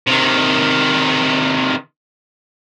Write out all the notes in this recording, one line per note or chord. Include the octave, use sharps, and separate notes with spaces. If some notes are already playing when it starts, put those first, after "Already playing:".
C3 D#3